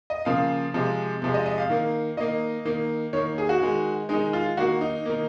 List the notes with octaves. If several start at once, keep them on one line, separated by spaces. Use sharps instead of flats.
D#5
C#3 F3 A#3 F5
C3 F3 G#3
C3 F3 G#3
D#5
D#5
F5
D#3 A#3
D#3 A#3 D#5
D#3 A#3
D#3 A#3 C#5
G#4
F#4
D#3 G#3
D#3 G#3 D#4
F4
D#3 A#3 F#4
D#4
D#3 A#3